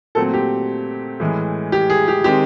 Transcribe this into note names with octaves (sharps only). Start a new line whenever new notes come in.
A#2 F#3 A3 C4 A4
G4
A2 E3 G#3
G4
G#4
G4
D#3 G#3 C4 G4